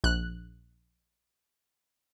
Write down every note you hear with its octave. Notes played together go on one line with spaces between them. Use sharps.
A#1 F#6